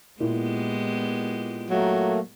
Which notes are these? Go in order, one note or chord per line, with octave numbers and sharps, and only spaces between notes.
A#2 G#3 B3 E4 G4
F#3 A3 A#3